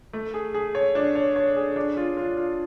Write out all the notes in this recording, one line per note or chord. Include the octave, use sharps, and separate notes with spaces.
A3
G#4
G#4
C#5
D4
C#5
C#5
G#4
D4
F4
F4
F4